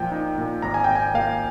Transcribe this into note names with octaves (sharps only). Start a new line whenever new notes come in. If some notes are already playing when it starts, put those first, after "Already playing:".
Already playing: A#2 F3 G5
D#4
A#2
G#1 A#5
G#5
G#1 G5
G#5
A#3 F5